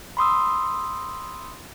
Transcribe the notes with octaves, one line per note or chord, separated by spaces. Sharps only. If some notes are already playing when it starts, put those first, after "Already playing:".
B5 C6 D#6 E6